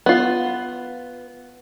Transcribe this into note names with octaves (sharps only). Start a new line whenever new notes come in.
B3 F4